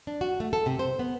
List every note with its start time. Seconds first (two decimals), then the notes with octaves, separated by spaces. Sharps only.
0.07 D4
0.21 F#4
0.40 A3
0.53 A4
0.66 C3
0.79 C5
0.99 B3